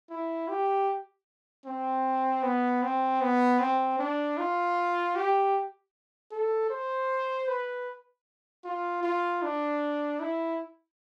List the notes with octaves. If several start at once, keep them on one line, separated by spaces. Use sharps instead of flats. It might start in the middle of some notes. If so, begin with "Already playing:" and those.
E4
G4
C4
B3
C4
B3
C4
D4
F4
G4
A4
C5
B4
F4
F4
D4
E4